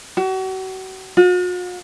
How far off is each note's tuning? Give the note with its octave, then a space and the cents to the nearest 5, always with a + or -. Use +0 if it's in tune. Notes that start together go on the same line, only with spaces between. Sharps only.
F#4 +35
F#4 -45